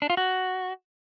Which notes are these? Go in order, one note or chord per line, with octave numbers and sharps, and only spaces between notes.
D4
F4
F#4